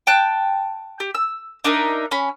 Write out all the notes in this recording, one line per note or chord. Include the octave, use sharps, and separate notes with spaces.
G5 A5 F#6
G4
E6
D4 D#4 A#4 E5
C#4 B5